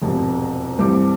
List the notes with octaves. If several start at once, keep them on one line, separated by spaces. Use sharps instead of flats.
E1 F2 G#2 C3
C2 G2 E3 C4 G4 D6